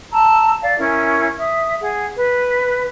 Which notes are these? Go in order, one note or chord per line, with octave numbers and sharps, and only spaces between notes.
A5 A#5 E6
D5 F5
C#4 E4 A#4 G#5
E5 D#6
G#4 F#5
B4